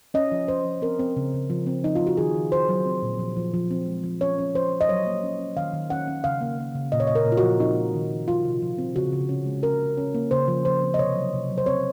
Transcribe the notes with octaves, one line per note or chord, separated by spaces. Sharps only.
C#4 D#5
F3
C#4 C5
F3
C4 A#4
C4
C#3
C#3
F3
C4
F3 D#4
F4
F3
F#4
D#3 G#4
D#3
D#3 C5
F#3
C4
A#2
F3
F3
F3
C4
G#3
F3
C#4 C#5
C#4
F3 C5
C#4
D#5
F#3 C#5
A#3
C#4
C#4
D#3 F5
D#3
C#4 F#5
C#4
C#3 F5
A#3
A#3
C#3
A#2 D#5
C#5
A#2 D#5
A#4
A#2
F4
F#4
F3
C4 D#4
G#3
D#3
D#3
F3 F4
C3
F3
C4
C#3 F#4
C#3
C#4
G#3
C#4 A#4
C#4
C#4
A#3
C#3 C5
F3
F3 C5
C4
D#5
C3 C#5
F#3
C3
F#3
C5
C4 C#5